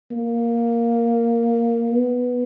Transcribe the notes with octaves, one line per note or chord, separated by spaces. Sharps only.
A#3
B3